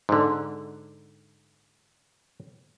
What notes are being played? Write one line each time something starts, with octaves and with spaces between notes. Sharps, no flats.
G#2 D3